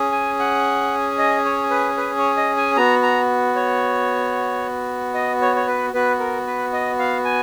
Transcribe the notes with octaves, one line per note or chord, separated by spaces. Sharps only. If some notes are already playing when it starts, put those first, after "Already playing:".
Already playing: C#4 G#4
G#5
F#5
D#5
C#5
B4
B4
C#5
D#5
G#5
B3 F#4 A#5
A#5
C#5
D#5
C#5
C#5
B4
B3 F#4 B4
A#4
B4
D#5
F5
G#5